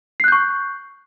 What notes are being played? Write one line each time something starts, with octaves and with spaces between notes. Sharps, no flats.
C#6 F#6 G6 C7